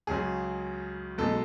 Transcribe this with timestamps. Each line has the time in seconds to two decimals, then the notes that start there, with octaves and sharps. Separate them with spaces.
0.07 C#2 C#3 F#3 G#4
1.18 B1 B2 G#3 A4